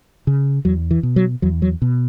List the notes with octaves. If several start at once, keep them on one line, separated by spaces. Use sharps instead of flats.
C#3
E2 F#3
E3
B2
F#3
E2 F#3
F#3
B2